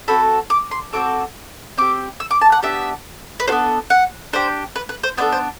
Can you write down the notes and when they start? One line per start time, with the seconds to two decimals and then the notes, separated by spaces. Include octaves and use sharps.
0.08 C4 F#4 A4 B5
0.50 D6
0.71 C6
0.93 C4 F#4 A4 D6
1.77 C4 G4 D6
2.20 E6
2.31 D6
2.41 A5
2.52 F#5
2.63 B3 D4 G4 E5
3.40 B4
3.48 B3 D4 F#4 A4 C5
3.90 F#5
4.33 D4 G4 C5
4.76 B4
4.89 B4
5.03 C5
5.17 B3 D4 A4 C5
5.32 C5